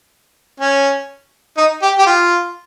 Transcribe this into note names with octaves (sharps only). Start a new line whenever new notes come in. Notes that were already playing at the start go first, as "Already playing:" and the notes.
C#4
D#4
G4
G4
F4